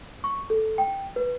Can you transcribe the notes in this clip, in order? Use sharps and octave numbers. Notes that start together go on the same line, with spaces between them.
C#6
A4
G5
B4